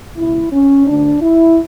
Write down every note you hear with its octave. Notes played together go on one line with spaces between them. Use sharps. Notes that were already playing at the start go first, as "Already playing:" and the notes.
C#2 B2 E4
C#4
D2 D3 D4
E4